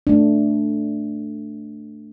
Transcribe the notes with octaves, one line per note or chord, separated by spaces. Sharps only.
A3 D4